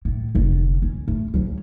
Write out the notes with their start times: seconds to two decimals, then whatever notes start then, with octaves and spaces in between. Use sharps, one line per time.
0.05 A2
0.35 F1 D3
0.82 C#4
1.08 A3
1.34 F#3 C#4